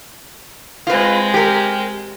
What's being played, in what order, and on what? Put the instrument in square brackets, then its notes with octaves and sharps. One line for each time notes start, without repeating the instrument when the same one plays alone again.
[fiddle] G#3 C4 [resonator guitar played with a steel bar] F4 B4
[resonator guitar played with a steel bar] G4 A#4